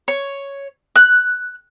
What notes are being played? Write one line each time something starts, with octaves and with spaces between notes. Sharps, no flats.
C#5
F#6